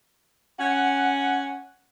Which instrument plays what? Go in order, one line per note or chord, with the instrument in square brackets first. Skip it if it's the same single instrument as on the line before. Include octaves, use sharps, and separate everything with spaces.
[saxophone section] C#4 F#5